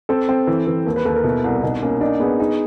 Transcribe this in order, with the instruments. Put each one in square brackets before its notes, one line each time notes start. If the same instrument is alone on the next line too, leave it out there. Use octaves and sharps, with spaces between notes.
[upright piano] C4 [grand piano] A4
[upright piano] C4
E3
E3
[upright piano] D#2 [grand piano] B4
[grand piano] B4
[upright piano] D#2 [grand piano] A4
[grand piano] A#4
[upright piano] B2 [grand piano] E4
[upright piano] C2
[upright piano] B2 [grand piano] D#4
[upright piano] A#3 [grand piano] C#4
[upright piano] D4 [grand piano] D#4
[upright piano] B3 [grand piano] G#4
[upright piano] D#4 [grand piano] G#4